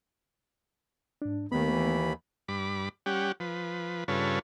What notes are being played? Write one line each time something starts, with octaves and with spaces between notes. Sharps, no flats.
G#2 D4
D#2 D#3 A3 B3 B5
E3
G2 B5 D6
G3 C#4 G4 F#5
F3 B4
G2 C#3 F4 A4 B4 C#5